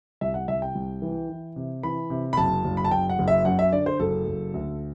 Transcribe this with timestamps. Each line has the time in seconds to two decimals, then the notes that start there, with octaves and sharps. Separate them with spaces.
0.21 C2 E5
0.34 F#5
0.48 C2 E5
0.62 G5
0.75 C2
1.02 E3
1.29 E3
1.56 C3
1.83 E3 B5
2.10 C3
2.33 B5
2.37 F#1 A5
2.65 F#1
2.77 B5
2.85 A5
2.91 F#1 G5
3.09 F#5
3.19 F#1
3.28 E5
3.45 F#2 F#5
3.59 E5
3.73 D3 D5
3.86 C5
4.00 F#1 A4
4.27 F#1
4.54 D2